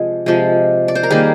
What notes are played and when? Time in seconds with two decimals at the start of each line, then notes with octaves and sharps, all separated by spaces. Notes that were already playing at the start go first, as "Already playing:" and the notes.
Already playing: C3 F3 G#3 F4 G#4
0.26 C3 F3 G#3
0.88 D5
0.95 C5
1.03 A#4
1.10 D#3 G3 A#3 G#4